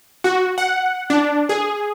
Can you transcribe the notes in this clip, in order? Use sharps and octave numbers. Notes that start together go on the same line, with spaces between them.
F#4
F#5
D4
G#4